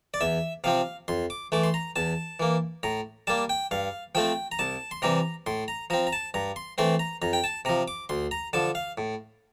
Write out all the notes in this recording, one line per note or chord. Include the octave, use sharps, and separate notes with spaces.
D5
E2 E5
C3 F3 C4 F5
F2 C6
D6
E3 A3 D6
C6
A#5
E2 A5
E3 A#3
A2 A#5
G3 A#3 A5
G5
G2 F5
F3 A3 C4 G5
A#5
C2 A5
C6
C3 E3 G3 C4 A#5
A2 C6
A#5
F3 C4 A#5
A#5
A5
G2 A#5
C6
E3 A3 C4 C6
A#5
F2 A#5
G5
A5
C3 F3 A#5
D6
D2 C6
A#5
D3 F3 A5
F5
A2